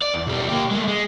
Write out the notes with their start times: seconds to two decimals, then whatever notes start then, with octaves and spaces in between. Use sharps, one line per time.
0.02 D5
0.14 E2
0.27 B1 G3
0.49 A#3 G4
0.71 G#3 A3
0.88 G#3